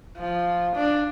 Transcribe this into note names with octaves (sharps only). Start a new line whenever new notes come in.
F3
D4